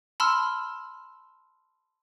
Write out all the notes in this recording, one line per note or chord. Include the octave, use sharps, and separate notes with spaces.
A5 B5 C6 E6 F6